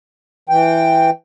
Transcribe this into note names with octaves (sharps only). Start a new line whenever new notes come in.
E3 G5